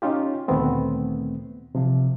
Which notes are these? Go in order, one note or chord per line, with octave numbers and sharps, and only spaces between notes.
C#4 D#4 F4 G4
D2 A#2 D#3 A3 B3 C4
C3 F3